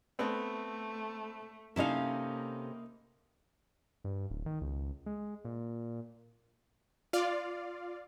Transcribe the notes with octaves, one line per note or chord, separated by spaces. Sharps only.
A3 B3 C4
C3 A#3 C#4 D#4 E4 A4 E5 F5
G2
D1
D#3
C#2
G#3
A#2
F4 D5 F5